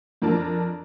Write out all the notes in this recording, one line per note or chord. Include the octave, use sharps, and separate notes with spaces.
F2 D4 A#4 A5